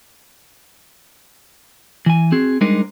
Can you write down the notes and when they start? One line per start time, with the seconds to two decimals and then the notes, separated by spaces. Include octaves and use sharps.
2.06 E3 G#5
2.32 C4 F#4 G#4
2.61 G3 G#3 D4 D#4 A#4 C5